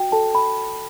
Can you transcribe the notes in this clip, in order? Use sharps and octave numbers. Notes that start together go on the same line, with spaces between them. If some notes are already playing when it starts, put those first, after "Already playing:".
Already playing: F#4 G5
A4 A5
B5